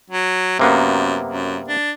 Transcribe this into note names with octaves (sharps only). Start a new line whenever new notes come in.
F#3
F#2 C3 A#3 B3
F#2
D4